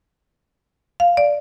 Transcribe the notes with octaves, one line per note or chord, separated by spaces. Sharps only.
F5
D5